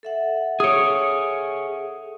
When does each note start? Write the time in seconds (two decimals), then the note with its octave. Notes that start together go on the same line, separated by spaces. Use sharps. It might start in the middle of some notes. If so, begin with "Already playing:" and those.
0.03 A4 E5 F#5
0.60 G#4 C#5 D#6 D7